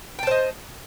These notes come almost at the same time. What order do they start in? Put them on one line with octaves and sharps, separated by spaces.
G5 A5 C5 D#5